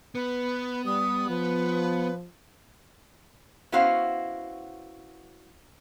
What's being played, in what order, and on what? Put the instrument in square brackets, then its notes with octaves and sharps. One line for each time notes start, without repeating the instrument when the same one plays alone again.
[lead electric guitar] B3 [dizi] B4
[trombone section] G3 [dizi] D#6
[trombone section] F3 [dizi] B4
[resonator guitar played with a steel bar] B3 C#4 E4 F#4 C5 F5